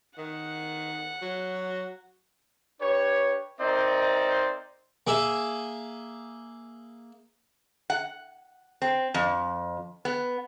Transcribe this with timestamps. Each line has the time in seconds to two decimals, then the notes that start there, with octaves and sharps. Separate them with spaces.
0.18 D#3 F#5
1.22 F#3
2.80 D4 G4 B4 C#5
3.60 C4 D#4 A#4 C5 D5 E5
5.07 A#3 G#4 E5
7.90 F#5
8.82 C4
9.14 F2
10.05 B3